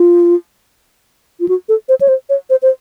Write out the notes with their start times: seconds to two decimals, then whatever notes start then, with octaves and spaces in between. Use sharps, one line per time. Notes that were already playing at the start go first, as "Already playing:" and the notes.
Already playing: F4
1.40 F4
1.49 F#4
1.69 A4
1.89 C5
2.01 C#5
2.08 C5
2.30 C#5
2.50 C5
2.62 C5